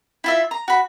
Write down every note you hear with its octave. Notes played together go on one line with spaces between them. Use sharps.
E4 F4 E5
A#5
F#4 B5